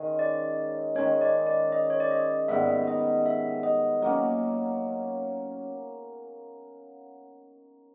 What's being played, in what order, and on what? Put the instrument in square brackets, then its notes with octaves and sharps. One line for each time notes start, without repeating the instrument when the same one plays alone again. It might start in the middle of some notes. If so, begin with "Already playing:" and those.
Already playing: [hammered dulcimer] D#3 G#3 C#4
[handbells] D5
[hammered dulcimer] D#3 G#3 C#4 [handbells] C#5
[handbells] D5
D5
D#5
C#5
D5
D#5
[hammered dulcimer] G#2 D#3 G3 B3 [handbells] E5
[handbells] D#5
E5
D#5
[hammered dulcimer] F#3 A#3 C#4